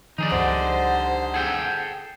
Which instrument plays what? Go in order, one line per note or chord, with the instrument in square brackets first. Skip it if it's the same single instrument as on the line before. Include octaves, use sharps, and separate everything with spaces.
[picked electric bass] D#3 F3 [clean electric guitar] D#4 G#4 D5
[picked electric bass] C#2 G2 F3 [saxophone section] D3 G3 C5 [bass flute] F#5
[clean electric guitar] G#4 A4 G5